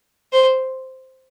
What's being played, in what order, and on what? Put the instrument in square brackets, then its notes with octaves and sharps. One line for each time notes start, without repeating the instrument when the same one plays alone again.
[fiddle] C5